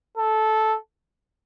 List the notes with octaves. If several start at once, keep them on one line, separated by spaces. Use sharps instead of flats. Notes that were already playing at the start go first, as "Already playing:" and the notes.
A4